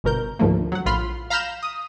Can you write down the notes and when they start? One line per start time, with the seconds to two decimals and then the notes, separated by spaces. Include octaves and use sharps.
0.04 G1 B2 A#4 G6
0.39 D2 G#2 D3 F3 A3 A#3
0.72 F#3 F#5
0.86 A#1 A2 F4 B5 C6 F6
1.30 F5 A#5 B5 F6 G6 E7
1.63 D#6